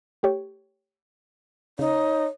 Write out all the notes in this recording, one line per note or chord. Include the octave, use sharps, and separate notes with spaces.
A3 G4 C#5
C#3 D#4 C#5